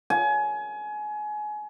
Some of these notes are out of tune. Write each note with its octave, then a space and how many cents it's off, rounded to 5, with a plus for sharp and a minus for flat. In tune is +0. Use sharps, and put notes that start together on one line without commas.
G#5 +25